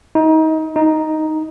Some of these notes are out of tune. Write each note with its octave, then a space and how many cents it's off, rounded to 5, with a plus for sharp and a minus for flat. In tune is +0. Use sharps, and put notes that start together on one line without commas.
D#4 +30
D#4 +5